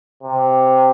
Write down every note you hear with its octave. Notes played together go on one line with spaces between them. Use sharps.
C3